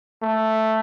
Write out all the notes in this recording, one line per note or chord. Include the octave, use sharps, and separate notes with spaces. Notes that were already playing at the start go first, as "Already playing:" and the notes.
A3